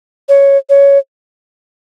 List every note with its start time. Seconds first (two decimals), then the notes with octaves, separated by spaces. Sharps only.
0.29 C#5
0.69 C#5